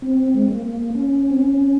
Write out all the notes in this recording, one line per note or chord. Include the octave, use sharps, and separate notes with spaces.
C4
G#3
A#3
C#4
C4
C#4